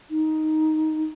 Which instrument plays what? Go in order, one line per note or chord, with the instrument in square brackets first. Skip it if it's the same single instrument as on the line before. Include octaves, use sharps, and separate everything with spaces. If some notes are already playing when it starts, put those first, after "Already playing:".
[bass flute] D#4